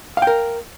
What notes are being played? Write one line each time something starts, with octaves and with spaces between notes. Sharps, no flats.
A#4 F5 G5